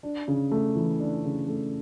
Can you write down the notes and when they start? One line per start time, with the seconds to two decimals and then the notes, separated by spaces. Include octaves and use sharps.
0.03 D4
0.28 C#3
0.52 A3
0.76 E3
1.00 D4
1.24 C#3
1.48 A3